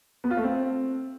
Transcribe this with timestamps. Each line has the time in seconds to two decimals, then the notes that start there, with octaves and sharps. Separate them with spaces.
0.24 B3
0.31 F4
0.37 A3
0.44 C4